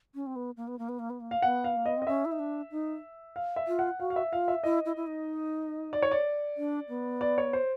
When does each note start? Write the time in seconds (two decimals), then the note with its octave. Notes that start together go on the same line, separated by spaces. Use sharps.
0.15 C#4
0.27 C4
0.36 B3
0.57 A#3
0.68 B3
0.79 A#3
0.89 B3
0.99 A#3
1.10 B3
1.20 A#3
1.31 F5
1.42 B3 F#5
1.64 F5
1.76 A#3
1.86 B3 D#5
1.97 C4 D#5
2.07 C#4 E5
2.25 E4
2.32 D#4
2.39 D4
2.71 D#4
3.36 F5
3.56 E5
3.68 F4
3.79 F#5
4.00 F#4 F5
4.10 F5
4.16 E5
4.32 F4 F5
4.48 E5
4.64 E4 D#5
4.86 E4
4.96 E4
5.07 D#4
5.93 D5
6.02 C#5
6.11 D5
6.57 D4
6.89 B3
7.21 D5
7.38 C#5
7.53 C5